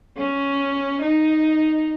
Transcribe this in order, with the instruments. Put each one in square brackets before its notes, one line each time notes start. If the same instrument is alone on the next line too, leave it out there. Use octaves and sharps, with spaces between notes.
[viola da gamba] C#4
D#4